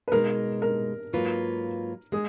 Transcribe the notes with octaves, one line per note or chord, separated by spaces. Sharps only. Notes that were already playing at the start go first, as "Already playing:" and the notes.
B4
B2 G#3 D#4 A#4
A#4
G#2 F#3 A#3 F4 B4
G#3 G#4